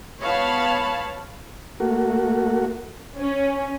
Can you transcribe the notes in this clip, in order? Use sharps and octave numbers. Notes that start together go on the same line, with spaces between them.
B3 C#5 F5 A5 B5
A3 A#3 F#4
C#4